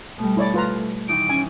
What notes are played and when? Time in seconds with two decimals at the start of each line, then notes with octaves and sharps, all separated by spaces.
0.18 B2 G3 A3
0.37 E4 C#5 D5
0.54 F4 B4 A#5
1.09 D#3 E3 D#4 D7
1.29 C#4 G#5